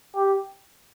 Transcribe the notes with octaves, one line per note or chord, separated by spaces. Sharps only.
G4